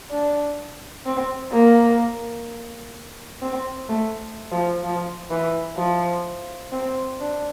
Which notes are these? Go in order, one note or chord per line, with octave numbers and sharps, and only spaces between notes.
D4
C4
A#3
C4
A3
F3
F3
E3
F3
C4
D4